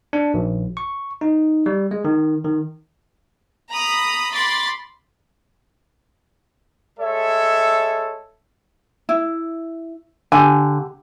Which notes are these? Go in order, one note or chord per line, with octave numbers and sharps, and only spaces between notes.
D4
A#1
C#6
D#4
G3
G#3
D#3
D#3
A#5 B5 D#6
B5 C6 D6 A6
G#3 A4 C#5 E5
E4
D3 G4 G#5